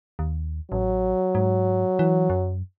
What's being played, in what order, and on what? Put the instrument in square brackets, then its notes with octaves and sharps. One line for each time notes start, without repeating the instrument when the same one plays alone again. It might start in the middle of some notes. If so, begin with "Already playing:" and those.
[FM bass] D#2
[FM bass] A1 [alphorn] F#3
[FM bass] G#2
E3
F#2